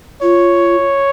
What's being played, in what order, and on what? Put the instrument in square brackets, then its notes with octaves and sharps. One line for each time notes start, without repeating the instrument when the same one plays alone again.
[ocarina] F4 [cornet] C#5